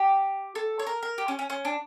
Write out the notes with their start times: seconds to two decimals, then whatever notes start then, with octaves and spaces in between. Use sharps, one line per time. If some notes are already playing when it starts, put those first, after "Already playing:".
Already playing: G4
0.55 A4
0.79 C#5
0.87 A#4
1.03 A#4
1.18 G4
1.28 C#4
1.39 C#4
1.50 C#4
1.65 D4